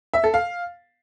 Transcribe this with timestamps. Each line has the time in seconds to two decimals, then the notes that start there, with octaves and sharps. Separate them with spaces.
0.14 E5
0.24 A4
0.34 F5